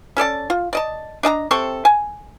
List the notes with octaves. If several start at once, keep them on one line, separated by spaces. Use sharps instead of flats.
C#4 A4 D5 A5
F4
D5 D#5 A5
D4 D#5 A5 A#5
C3 C4 A4 C#6
G#5